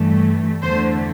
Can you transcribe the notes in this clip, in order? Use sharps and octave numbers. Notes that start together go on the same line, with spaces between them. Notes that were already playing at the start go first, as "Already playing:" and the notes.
Already playing: G2 E3 A3
E2 D3 A3 C5